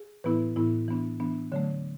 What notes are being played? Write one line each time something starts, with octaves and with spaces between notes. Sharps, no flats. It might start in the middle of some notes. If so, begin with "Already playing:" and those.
Already playing: G#4
A2 E3 B3 E4 B4
A2 E3 B3 E4
E3 B3 D4
E3 B3 D4
D3 F#3 A3 C#5